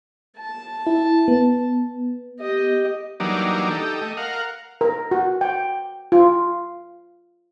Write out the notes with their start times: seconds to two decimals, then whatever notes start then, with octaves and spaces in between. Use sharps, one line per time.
0.38 A5
0.87 E4
1.28 B3
2.39 G4 D#5
3.20 E3 F#3 G3 A#3 D4 D#4
3.71 D#4 G4 A4
4.01 A3 D#5
4.17 A#4 F5 F#5
4.81 A#4
5.11 F#4
5.41 G5
6.12 F4